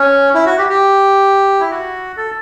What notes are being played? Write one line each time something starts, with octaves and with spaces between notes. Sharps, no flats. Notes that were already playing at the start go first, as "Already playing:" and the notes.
Already playing: C#4
E4
F#4
G4
G4
E4
F#4
A4